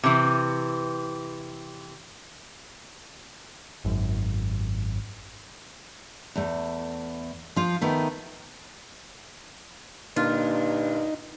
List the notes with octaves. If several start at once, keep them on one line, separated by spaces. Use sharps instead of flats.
C3 E3
G#1 F#2
E2 A3
F3 F4
D#3 A3 B3
G2 A#2 D3 D#4 F4